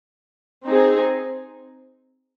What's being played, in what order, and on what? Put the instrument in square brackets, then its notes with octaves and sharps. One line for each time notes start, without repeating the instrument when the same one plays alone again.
[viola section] C4 D#4 G#4